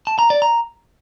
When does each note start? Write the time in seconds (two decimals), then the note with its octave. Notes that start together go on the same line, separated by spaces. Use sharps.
0.07 A5
0.19 A#5
0.30 D5
0.42 A#5